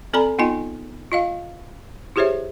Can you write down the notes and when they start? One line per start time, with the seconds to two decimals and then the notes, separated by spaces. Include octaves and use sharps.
0.13 C4 A4 D5 G#5 A#5 B5
0.39 B3 D#4 F4 D#5 G#5
1.12 F4 D#5 F5
2.16 E4 G4 G#4 C5 C#5 E5